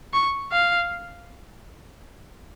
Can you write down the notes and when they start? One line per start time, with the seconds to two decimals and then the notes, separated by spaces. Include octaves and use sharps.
0.13 C#6
0.52 F5